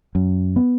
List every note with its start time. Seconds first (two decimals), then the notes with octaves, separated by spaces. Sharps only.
0.15 F#2
0.56 B3